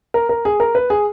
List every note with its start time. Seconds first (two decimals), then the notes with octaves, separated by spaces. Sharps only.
0.14 A#4
0.29 A#4
0.45 G#4
0.60 A#4
0.75 B4
0.90 G#4